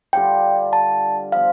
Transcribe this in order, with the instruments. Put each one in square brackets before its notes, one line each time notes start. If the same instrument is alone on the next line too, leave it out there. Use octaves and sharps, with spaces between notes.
[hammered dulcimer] D3 G3 D4 F4 [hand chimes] G5
[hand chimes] A5
[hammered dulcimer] F3 B3 [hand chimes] F5